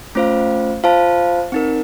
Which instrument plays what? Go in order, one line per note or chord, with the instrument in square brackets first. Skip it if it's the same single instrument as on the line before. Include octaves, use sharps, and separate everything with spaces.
[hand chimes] A3 C#4 F4 C5 F5
F4 C5 F5 A5
C4 D#4 A#4